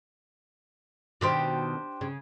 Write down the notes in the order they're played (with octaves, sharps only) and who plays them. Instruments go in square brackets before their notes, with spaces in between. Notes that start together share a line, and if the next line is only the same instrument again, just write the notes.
[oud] B2 D#3 B3 [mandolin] D4 G4 C5
[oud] C#3